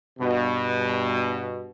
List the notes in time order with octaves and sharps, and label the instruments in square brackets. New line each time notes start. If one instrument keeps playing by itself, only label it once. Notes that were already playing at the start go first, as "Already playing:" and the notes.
[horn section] G2 B2